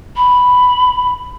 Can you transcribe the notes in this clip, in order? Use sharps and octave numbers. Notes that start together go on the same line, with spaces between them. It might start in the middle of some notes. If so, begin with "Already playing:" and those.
B5